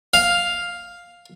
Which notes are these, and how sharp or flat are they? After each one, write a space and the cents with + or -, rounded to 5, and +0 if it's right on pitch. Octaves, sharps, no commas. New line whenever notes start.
F5 +5